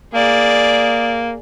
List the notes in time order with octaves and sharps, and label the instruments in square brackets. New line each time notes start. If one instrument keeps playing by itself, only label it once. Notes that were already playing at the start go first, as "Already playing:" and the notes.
[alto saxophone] A#3 [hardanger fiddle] G#4 D5